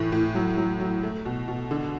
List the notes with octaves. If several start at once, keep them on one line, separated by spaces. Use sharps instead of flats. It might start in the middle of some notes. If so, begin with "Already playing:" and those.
Already playing: A2 E3
A2
F#3
F#3
F#3
A3
B2
B2
D3